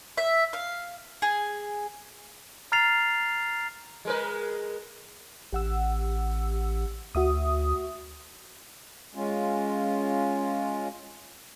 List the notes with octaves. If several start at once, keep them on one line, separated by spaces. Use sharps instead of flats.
E5
F5
G#4
A#5 F6 A6 C7 F7
G#3 A#4 B4
A1 G4 F#5 E6
D2 F#4 E5 D#6
G#3 C#4 F4